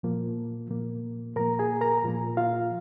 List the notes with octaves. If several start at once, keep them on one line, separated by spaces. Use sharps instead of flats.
A#2 F3 A#3
A#2 F3 A#3
A#2 F3 A#3 A#4 A#5
G#4 G#5
A#4 A#5
A#2 F3 A#3
F4 F5